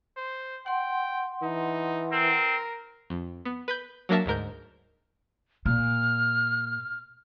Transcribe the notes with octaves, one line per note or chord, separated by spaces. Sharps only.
C5
F#5 G5 C6
E3 D#4
C4 A#4
F2
B3
B4 B5 G6
F#3 A#3 D4 A#4 E5 A5
D2 G#2 A#4 G6
A#2 F6